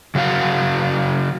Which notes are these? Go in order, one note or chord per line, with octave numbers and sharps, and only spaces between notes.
C#3 F#3 F#4 F5